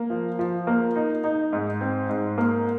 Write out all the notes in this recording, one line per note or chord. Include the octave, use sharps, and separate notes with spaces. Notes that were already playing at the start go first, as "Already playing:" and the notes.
Already playing: A#3
F3
F3
A#3
D#4
D#4
G#2
C4
G#2
A#3